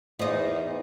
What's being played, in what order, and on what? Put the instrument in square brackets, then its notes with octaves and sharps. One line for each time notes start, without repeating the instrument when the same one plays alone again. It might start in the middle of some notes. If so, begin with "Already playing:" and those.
[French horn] E2 [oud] D#4 D#5 [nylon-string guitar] F4 C5 D5